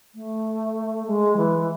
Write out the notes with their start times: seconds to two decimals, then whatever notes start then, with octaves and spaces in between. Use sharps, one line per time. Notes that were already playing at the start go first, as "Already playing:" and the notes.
0.15 A3
1.06 G#3
1.36 E3